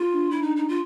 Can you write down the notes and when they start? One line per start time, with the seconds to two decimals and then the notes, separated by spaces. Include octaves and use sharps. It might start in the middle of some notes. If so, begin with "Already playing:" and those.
Already playing: F4
0.11 D4
0.31 E4
0.42 D#4
0.56 D#4
0.68 F4